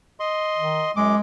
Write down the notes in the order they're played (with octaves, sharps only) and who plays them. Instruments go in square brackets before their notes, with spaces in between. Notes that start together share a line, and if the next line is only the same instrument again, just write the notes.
[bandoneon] D#5 C6
[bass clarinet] D#3
[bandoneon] F#2 D6 [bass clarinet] G#3